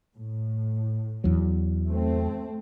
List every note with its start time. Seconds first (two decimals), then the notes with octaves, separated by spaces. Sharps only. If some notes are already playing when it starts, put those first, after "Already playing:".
0.14 A2
1.24 E2 F#3
1.87 A3 C4